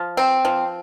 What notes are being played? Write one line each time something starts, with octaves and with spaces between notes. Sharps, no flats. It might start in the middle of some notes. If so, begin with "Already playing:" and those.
Already playing: F3
C4
F3